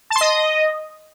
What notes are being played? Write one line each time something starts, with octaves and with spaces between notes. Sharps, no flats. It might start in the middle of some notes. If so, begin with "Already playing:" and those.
A5
C6
D#5